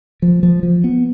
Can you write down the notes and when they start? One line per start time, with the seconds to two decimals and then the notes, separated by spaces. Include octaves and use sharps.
0.22 F3
0.43 F3
0.63 F3
0.84 B3